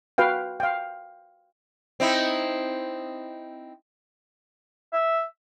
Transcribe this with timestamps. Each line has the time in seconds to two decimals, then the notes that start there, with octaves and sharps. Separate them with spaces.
0.18 F#4 B4 F5 G5
0.60 F5 G5
2.00 C4 D#4 E4
4.93 E5